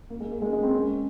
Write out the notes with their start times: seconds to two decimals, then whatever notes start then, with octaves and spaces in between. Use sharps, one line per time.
0.10 A#3
0.20 G#3
0.32 A#3
0.42 G#3
0.53 G#3
0.63 C4
0.74 C#4